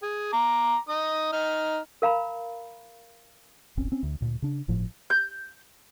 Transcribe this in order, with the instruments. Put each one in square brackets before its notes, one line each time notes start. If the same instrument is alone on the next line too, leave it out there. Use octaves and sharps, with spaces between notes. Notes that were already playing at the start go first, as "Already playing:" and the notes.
[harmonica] G#4
A#5 D6
D#4 D#6
D#4 F6
[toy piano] A#4 F5 A#5 B5
[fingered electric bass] D1 G1 C4 C#4
C4 C#4
D2
D2 A#2
C#3 D4
G1 A2 F3
[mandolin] G6